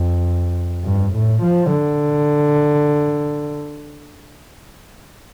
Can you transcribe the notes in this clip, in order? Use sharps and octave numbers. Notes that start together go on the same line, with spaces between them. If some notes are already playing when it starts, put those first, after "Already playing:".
Already playing: F2
G2
A2
F3
D3